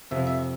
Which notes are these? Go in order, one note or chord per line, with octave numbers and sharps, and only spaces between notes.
F2 C3 F3 E5
E5